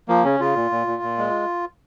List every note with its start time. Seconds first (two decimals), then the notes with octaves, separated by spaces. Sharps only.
0.09 F3 A#3
0.24 C#3 C#4
0.40 C#3 F4
0.56 A#2
0.71 A#2
0.87 A#2
1.03 A#2
1.18 G#3